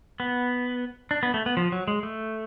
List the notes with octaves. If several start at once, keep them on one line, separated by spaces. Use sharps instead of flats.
B3
D4
B3
A3
B3
F3
F#3
G#3
A3